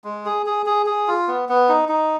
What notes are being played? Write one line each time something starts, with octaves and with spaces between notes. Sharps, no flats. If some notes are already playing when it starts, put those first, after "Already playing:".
G#3
G#4
G#4
G#4
G#4
F4
B3
B3
D#4
D#4